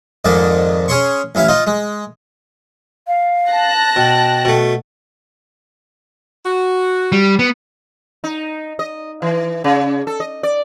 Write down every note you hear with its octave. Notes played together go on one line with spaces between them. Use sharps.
F2 G#2 D#3 D5
C#4 G#4 C#5 C6 C#6
A1 C#4 E4 F5
D#4 F4
G#3
F5
A5 F#6 A#6
B2 G5
B2 A3
F#4
G3
B3
D#4
D#5
E3
C#3
A4
D#5
D5